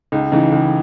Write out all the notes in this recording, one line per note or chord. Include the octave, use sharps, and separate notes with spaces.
C#2 D#4
C#3 E3 D#4
C#2